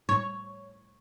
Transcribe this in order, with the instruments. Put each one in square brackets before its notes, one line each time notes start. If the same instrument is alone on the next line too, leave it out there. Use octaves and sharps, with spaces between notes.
[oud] C#5